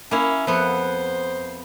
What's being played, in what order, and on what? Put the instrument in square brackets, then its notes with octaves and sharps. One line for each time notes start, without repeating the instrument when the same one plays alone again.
[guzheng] A#3 E4 [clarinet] C#4
[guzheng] F2 B3 F#5 [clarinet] C5